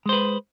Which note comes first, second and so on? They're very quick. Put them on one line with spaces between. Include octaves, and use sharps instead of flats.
G#3 C5 B4